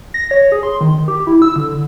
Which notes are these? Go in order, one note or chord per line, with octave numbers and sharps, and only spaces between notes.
A#6
C#5
G#4
C6
D#3
D#3
G4
E4
E6
D3